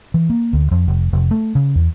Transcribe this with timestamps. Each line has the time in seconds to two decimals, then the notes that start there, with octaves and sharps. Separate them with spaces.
0.14 E3
0.30 A#3
0.53 D2
0.71 F2
0.88 F1
1.13 F1
1.31 A3
1.55 C#3
1.75 E2